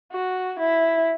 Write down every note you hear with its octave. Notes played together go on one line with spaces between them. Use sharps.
F#4
E4